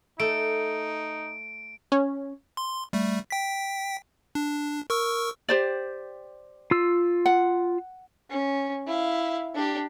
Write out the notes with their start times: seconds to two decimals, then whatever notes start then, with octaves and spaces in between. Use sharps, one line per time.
0.20 A3 D#4 D7
1.92 C#4
2.57 C6
2.93 G3 A3
3.30 G5 B6
4.35 D4
4.90 A#4 C#6 E6
5.49 G4 C5 D5
6.71 F4 E6
7.26 F#5
8.30 C#4
8.87 E4 F5
9.54 D4 G4